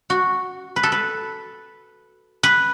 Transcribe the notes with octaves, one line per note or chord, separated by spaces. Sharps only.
F#4
B4
A4
B4
B4